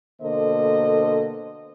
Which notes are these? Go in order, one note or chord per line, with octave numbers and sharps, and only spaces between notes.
B2 D3 A#3 A4 C5 D#5